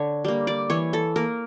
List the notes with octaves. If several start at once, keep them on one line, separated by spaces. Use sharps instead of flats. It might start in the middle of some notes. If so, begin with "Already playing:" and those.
Already playing: D3 C#5
G3 A#3
D5
E3 C#5
A4
A#3 A#4